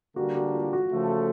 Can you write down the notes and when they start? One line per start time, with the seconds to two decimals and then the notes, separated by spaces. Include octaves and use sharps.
0.16 D3 G3 A#3 D4 F#4 G4
0.35 F#4
0.54 F4
0.73 F#4
0.91 C#3 F3 A3